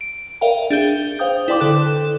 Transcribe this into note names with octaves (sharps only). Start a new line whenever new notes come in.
D7
A#4 D5 E5 F5 G5
D4 G#4 G6 G7
C5 F5 G5 D#6 G6
E4 B4 D5 G5 C6 D6
D3 A4 F#6 E7